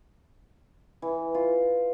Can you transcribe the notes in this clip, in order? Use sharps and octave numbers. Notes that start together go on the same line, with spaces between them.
E3
F4